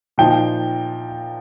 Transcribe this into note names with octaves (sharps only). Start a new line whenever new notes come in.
A#2 F3 D#4 G5